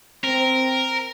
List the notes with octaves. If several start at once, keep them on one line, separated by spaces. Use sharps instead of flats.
C4 A#4